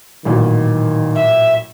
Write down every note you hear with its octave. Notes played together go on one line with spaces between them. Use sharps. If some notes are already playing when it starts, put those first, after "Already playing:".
A1 A#2 D#3 F#3
E5